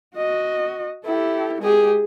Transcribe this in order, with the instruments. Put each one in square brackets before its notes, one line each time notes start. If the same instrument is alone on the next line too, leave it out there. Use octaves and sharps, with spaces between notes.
[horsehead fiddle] F#4 D#5
[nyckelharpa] E4 [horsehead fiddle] G4 A4
[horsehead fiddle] G#3 G4 [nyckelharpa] G#4